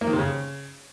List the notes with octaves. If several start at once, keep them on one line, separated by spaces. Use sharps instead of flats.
A#3
D#3
C3
C#3